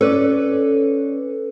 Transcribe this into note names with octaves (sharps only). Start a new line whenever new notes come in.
C#4 A4 B4 D5